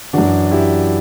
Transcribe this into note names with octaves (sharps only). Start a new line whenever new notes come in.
F#2 E3 D4 F#4
E4 G4